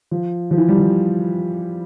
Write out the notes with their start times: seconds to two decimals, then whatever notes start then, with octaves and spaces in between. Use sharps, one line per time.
0.11 F3
0.51 F3
0.57 E3
0.68 G3
0.80 F3